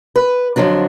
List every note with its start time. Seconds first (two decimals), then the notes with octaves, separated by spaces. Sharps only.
0.16 B4
0.56 F2 D3 F3 F#3 D4